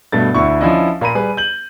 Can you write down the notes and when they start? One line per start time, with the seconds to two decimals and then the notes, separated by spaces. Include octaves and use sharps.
0.12 G2 B2 A3 A6
0.35 D2 D3 E4 C#6
0.61 F3 C#4 D4 E4 D#5
1.01 A#2 A#3 A#5 B5 D#7
1.15 G3 G#4 B4
1.37 G6 F#7